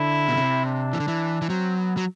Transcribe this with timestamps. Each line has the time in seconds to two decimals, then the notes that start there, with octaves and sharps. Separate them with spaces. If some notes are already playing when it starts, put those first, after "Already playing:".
Already playing: D3 E4
0.28 B2
0.37 C3
0.65 D4
0.93 E3
1.00 D3
1.08 E3
1.42 E3
1.48 F#3 C4
1.78 B3
1.97 F#3